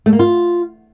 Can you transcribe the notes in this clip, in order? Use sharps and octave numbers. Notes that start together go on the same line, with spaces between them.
A3
A#3
F4